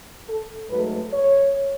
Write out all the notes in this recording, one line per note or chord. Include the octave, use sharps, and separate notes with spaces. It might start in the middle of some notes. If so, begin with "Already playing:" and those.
A4
G#2 F#3 A3 B4
C#5